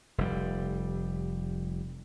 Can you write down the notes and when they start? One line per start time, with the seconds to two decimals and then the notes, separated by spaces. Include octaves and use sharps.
0.18 F1 G3